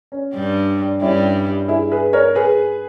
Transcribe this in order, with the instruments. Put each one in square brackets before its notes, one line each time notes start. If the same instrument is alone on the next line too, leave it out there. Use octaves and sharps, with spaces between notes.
[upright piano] C#4
[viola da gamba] G2 G3
[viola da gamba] G2 G3 [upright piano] C#4 E4
[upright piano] E4 G#4
G#4 B4
A#4 C#5
G#4 B4